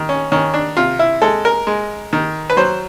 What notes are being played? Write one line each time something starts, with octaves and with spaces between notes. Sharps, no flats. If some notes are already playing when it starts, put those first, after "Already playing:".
Already playing: D#3
C#4
D#3 C#4
D4
C3 F4
E4
G#3 A4
A#4
G#3
D#3
B4
F#3 C5